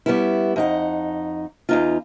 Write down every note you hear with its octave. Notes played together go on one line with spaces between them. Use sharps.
G3 B3 C#4 E4
F2 D#4 F#5
E2 D#4 F4